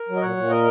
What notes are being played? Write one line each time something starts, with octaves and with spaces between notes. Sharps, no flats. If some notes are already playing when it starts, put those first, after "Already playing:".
Already playing: A#4
F#3
D#5
A#2 C#5 F#5
A#2
A#4 D#5